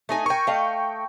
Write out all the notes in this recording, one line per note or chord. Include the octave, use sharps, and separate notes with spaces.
A3 D#4 G#5
A#4 G5 G#5 C#6
A3 D#5 F5